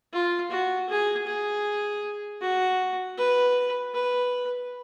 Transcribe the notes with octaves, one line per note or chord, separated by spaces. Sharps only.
F4
F#4
G#4
G#4
F#4
B4
B4